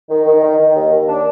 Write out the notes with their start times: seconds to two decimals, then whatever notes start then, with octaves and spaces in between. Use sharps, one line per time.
0.09 D#3
0.26 D#3
0.42 D#3
0.59 D#3
0.75 D#2
0.91 D#2
1.08 D4